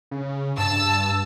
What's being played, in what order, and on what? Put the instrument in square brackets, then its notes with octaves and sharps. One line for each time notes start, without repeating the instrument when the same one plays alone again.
[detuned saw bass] C#3
[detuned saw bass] G2 [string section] A5 E6